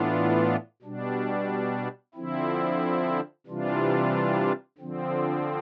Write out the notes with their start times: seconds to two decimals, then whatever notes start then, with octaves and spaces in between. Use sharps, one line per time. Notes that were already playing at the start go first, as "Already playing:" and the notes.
Already playing: A2 E3 B3 D4 F4
0.82 B2 G3 D4
2.15 D3 F3 C4 E4
3.46 C3 E3 G3 D4 F4
4.78 D3 F3 C4